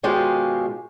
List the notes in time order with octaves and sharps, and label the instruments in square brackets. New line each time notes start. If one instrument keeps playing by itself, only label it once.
[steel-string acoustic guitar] B2 D#3 G#3 C#4 F4 G4